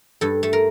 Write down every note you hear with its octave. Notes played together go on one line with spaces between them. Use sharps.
G2 A4
A3
A#4